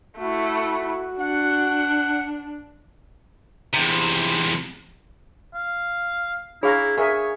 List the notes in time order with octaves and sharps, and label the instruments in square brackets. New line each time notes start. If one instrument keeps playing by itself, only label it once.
[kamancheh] A3 E4 [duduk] F#4
[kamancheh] D4 [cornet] F#5
[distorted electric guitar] E2 C3
[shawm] F5
[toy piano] D4 G#4 B5 [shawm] E4 [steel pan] C#5 F5 A#5
[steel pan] G#4 A#4 E5 [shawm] C#5 [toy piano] F5